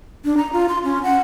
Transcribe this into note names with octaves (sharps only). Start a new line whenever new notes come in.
D4
A#5
F4
C6
C#4
F#5